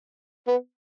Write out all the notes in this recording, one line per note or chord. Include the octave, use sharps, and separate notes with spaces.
B3